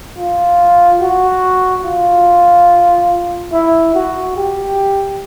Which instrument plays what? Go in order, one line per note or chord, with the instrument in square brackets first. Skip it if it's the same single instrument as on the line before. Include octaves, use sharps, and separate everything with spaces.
[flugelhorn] F4
F#4
F4
E4
F#4
G4